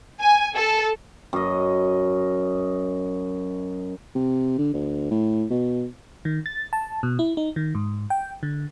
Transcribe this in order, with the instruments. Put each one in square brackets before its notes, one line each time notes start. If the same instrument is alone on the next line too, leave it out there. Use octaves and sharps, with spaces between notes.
[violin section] G#5
A4
[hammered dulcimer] F#2 D#5
[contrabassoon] C3
D3
D2
A2
B2
[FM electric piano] D#3
A6
A5
B2
E4
D#4
D#3
G#2
G5
D3